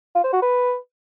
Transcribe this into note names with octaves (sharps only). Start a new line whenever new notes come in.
F4
C5
F#4
B4